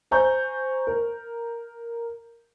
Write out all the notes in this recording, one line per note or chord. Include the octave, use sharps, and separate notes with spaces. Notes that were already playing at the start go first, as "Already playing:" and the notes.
C5 G#5 A#5 C#6 G6
A#4